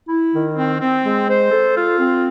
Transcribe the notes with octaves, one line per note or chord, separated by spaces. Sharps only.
E4
D#3
C4
C4
G#3
C5
A4
F4
C4